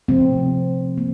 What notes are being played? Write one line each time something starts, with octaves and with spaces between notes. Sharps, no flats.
C3 F3 A3 C4
A#3